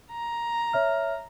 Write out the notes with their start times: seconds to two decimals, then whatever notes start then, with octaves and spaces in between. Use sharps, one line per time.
0.12 A#5
0.73 C#5 E5 F6